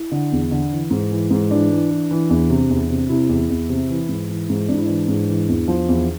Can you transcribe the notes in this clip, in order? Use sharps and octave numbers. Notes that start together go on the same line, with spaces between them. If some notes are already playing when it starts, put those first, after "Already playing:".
Already playing: E4
D3
E2
D3
E3
G#2
E3
G#2
E3 D4
E3
E3
E3
E2
C3
E2
C3
C3 E4
E2
E2
C3
E3
G#2
E3
G#2
G#2 D4
E4
E3 D4
G#2
E3
E2
F3
E2